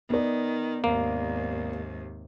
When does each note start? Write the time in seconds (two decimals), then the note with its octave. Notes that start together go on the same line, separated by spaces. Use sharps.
0.10 D#3 B3 D5
0.84 D#2 G#2 C3 A#3